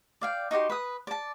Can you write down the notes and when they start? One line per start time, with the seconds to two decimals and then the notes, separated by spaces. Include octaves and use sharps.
0.21 D5 F5 G5
0.51 D#4 F#4 G4 C6
0.70 B4 D#6
1.07 D5 A5